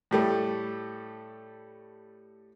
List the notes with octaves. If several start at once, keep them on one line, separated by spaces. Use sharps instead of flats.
A2 G3 A3